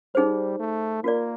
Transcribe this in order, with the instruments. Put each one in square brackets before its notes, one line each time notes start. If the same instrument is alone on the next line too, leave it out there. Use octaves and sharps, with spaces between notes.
[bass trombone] G3 [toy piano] D#4 G#4 C5
[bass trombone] A3
[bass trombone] A#3 [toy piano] F4 A#4 D5